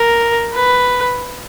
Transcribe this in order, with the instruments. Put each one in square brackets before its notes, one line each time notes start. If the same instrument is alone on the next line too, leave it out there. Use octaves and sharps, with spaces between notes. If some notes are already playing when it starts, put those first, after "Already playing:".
Already playing: [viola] A#4
B4